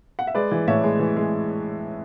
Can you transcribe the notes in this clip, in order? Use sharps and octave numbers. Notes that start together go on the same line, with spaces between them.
F#5
E5
G#3 B4 D5
E3
A2 C#5 E5
G#3
E3
G#3